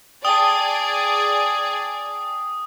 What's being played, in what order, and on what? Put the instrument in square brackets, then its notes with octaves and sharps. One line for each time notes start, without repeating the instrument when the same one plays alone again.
[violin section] G#4 D5 [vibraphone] G5 A5 [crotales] D#6